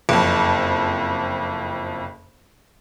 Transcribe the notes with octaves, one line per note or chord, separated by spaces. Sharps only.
F#1 F2